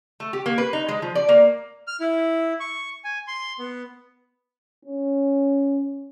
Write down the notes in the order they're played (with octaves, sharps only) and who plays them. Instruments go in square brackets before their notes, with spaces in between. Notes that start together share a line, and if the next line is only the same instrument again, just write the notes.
[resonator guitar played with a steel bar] A3
G4
A#3
B4
D#4
G#3
F3
D5
A#3
[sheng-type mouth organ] F6
E4
C#6
G#5
C6
B3
[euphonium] C#4